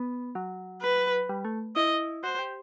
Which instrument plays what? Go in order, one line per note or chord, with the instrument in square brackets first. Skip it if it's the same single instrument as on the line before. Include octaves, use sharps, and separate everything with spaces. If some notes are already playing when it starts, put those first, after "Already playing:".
Already playing: [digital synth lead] B3
F#3
[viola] B4
[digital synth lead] G3
A3
[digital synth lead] E4 [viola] D#5
[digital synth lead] F#4 [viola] C5
[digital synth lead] G4